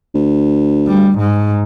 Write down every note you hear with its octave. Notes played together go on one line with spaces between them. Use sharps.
D2
G3
G#2